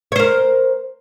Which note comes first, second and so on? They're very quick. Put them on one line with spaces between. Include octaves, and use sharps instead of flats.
C#5 C5 A#4